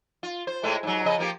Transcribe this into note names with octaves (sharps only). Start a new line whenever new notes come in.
F4
C5
A2 G#3 A3
G#2 F#3
C#3 F3 D#5
F3 A#3 G4